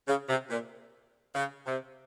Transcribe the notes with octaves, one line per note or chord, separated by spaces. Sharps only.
C#3
C3
A#2
C#3
C3